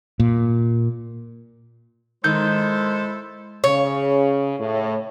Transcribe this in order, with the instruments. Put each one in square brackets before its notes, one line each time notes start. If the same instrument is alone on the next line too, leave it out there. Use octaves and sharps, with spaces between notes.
[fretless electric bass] A#2
[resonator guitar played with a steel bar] D#3 [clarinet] G#3 [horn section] E4 A4 C5 [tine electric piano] G6
[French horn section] C#3 [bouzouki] C#5
[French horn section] A2